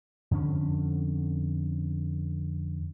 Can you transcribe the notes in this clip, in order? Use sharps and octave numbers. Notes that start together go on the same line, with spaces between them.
F2 D3 B3 C#4